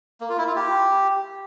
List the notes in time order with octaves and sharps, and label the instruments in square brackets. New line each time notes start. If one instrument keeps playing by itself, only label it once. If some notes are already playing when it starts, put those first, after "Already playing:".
[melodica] A#3
F4
E4
F4
G4